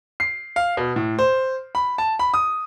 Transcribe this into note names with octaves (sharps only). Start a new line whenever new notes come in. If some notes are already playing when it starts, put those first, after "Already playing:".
C7
F5
B2
A2
C5
B5
A5
B5
D#6